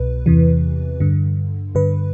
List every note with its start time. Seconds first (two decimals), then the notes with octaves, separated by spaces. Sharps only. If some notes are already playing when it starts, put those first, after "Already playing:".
Already playing: C2 B2 B4
0.26 E2 C3 E3
1.00 G2 D3
1.75 G2 D3 B4